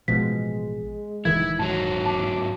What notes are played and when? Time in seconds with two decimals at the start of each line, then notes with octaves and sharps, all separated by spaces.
0.08 A1 B2 F3 G#3 B6
1.25 D#1 D#3 E3 E4 G#6
1.59 G#2 F#3 A5
2.06 A5 D6